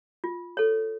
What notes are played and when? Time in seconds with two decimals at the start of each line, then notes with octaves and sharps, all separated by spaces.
0.24 F4
0.57 A4 C#5